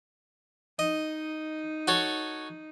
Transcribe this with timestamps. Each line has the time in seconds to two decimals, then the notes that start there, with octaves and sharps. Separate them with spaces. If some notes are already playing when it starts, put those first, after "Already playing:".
0.79 D#4 D#5
1.88 F#4 A4 C#5